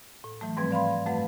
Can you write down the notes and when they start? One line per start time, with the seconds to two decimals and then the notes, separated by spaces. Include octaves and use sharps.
0.24 A2
0.41 E3 F#3 A3
0.57 G#2 F3 G3 C4 B4 G#6
0.71 D5 F5 B5 C6
1.06 F#2 A3 B4 F#5